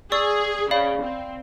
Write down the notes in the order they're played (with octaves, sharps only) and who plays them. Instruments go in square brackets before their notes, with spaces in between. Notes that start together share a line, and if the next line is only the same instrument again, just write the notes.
[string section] G#4 [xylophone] D5 C#6 E6
[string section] C#3 [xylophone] D5 F5 B5
[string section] C4